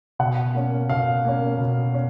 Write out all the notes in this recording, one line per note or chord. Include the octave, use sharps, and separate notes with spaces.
B2 F#5
A#3 C#4
B2 F5
A#3 C#4
B2
C#4